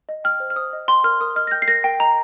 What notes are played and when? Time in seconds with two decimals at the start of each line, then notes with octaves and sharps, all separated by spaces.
0.09 D#5
0.24 G5 F6
0.40 C5
0.50 F6
0.56 C5 D#6
0.73 D#5
0.88 G5 C6
1.04 A#4 F6
1.20 A#4 D#6
1.36 D#5 F6
1.47 A#6
1.51 G5 G6
1.62 C7
1.68 A#4 A#6
1.84 A#4 G5
1.99 D#5 A#5